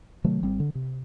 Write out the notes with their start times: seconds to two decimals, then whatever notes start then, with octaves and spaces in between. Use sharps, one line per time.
0.24 C3 D#3 F#3 A3
0.42 G#1 G3 C4
0.60 D3
0.75 C3